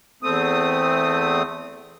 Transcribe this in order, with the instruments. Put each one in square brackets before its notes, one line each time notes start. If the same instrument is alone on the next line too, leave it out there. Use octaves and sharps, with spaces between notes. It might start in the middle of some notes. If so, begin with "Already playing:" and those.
[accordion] E2 A3 C4 D#6